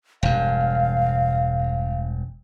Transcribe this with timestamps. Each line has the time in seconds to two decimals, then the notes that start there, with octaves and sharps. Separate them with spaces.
0.23 E1 G2 F5